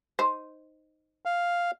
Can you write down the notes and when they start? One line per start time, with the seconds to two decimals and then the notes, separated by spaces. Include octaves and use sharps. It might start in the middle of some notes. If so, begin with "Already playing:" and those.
0.19 D#4 C5
1.25 F5